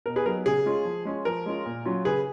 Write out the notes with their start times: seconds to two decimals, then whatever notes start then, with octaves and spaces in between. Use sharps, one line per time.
0.06 B2 A#4
0.16 G#4 B4
0.26 F#3 B3 D#4 A#4
0.46 C#3 G#4
0.66 G#3 C#4 F4
0.85 F3
1.05 G#3 C#4 F4
1.25 F3 A#4
1.46 G#3 C#4 F4
1.66 A#2
1.85 F#3 C#4 F4
2.05 C#3 G#4 B4